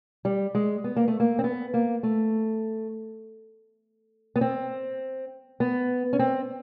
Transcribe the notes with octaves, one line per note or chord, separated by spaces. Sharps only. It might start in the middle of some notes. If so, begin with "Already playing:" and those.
G3
G#3
B3
A#3
A3
A#3
C4
B3
A#3
A3
B3
C4
B3
C#4
C4